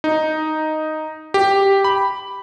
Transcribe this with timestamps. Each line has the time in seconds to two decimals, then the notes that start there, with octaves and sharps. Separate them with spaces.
0.04 D#4
1.34 G4
1.84 B5